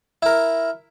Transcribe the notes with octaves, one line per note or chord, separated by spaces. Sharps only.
E4 A#4